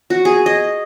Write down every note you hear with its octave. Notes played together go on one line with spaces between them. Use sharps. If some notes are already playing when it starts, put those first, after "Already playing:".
F#4
G#4
D#5